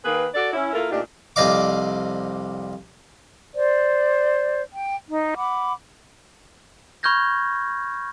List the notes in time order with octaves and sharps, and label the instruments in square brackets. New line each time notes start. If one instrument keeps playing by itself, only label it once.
[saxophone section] D#3 A#3 G#4 B4
F#4 A4 D5
C#4 E4
A#3 E4 F4 A4 A#4
A#2 A3 D4 D#4 G4
[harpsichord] C2 F2 D5 D#5 F5 D6
[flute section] C5 D5
G5
D#4
F#5 B5 D6
[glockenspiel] B5 C#6 F6 G6 G#6 A#6